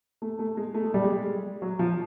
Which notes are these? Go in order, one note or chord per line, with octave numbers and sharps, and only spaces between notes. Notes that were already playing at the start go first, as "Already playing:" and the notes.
A3
A3
G#3
A3
G#3
G3
G#3
F#3
F3